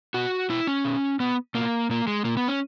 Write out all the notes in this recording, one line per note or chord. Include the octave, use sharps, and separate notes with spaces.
B2 F#4
B2 E4
C#4
B2
B2 B3
B2 A#3
A#2 A#3
G#3
A#2 A#3
B3
C#4